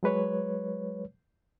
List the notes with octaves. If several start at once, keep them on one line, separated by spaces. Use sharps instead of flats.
F#3 G#3 B4 C#5